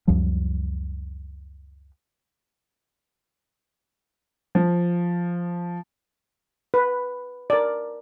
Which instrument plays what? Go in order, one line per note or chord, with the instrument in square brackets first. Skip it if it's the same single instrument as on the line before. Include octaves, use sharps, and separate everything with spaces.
[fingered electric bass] C#2 F#2 F3 G3
[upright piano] F3
[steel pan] B4
A#4 D5